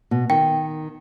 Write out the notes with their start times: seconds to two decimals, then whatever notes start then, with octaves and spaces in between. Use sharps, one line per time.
0.11 B2
0.30 D#3 G5